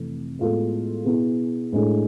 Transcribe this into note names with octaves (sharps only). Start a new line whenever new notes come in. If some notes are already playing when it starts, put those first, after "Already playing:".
Already playing: F1 F2 E3 A3
A2 G#3 B3 F4 A4
B2 B3 E4 G#4
A2 G#3 D4 A4